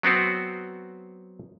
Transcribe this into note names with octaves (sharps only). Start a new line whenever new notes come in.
F#3 B3 C4 F#4